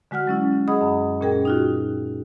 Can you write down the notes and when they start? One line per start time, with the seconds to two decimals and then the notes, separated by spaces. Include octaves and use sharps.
0.11 D3 G#3 F#4 F#5 F6
0.27 F#3 C#4 E4
0.68 G#4 D#5 F#5 B5 D#6
0.81 F#2
1.21 A#2 C#4 G#4 A#4 G5
1.45 D#4 F4 F#4